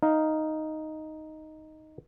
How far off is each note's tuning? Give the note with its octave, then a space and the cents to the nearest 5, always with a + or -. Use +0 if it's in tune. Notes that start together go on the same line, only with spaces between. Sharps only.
D#4 +0 F5 +0